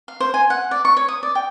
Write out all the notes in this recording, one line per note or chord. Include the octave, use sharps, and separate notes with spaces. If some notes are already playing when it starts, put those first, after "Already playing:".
F5
C5
G#5
F#5
D5
C#6
C#5
D#6
D5
G5